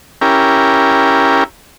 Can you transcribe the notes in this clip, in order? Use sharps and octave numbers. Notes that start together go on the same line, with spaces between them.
C#4 E4 G4 A#4